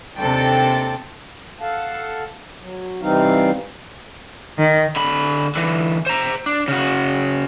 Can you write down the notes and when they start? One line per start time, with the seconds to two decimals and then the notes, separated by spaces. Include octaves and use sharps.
0.18 D#2 C3 D4 A4 G5 A6
1.60 A4 F5 F#5 A5
2.60 F#3
3.02 C3 E3 G3 C4 D#4 F5
4.58 D#3
4.96 D3 B5
5.56 D3 E3
6.06 C5 A#5
6.46 D4
6.68 C#3 F#4